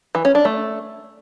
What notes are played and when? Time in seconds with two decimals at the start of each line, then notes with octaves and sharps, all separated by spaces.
0.15 E3
0.25 C#4
0.35 D4
0.45 A3